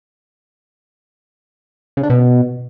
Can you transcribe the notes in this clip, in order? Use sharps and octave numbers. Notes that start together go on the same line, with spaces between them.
C#3
D4
B2